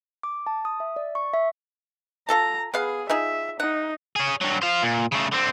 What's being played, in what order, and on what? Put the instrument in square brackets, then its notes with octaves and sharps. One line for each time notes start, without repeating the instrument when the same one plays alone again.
[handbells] D6
A5
D#6
E5
D5
C#6
E5
[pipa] F4 A4 A5 [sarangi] A#5
[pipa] B3 B4 F5 [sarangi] G#4
[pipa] D#4 F4 G#4 [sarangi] E5
[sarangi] D#4 [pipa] F#5
[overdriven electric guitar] C#4 G#4
G2 F#3
C5 F5
A#2
C#3 A3
D3 C4